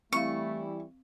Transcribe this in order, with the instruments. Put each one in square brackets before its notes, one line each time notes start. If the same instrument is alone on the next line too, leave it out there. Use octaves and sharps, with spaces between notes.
[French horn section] E3 G3 E4 [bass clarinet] A3 [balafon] C4 F5 [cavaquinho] C#6